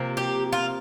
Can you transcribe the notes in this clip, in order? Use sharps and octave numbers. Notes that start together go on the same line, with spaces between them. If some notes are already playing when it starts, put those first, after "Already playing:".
Already playing: C3 F3 A#3
G4
F4